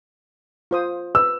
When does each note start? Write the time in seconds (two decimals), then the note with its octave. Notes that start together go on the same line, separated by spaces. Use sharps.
0.71 F4 C5 D#6
1.15 B4 E6